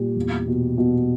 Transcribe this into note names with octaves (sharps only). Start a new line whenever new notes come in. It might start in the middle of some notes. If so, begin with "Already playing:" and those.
Already playing: A#2 G3
E2
B2
B2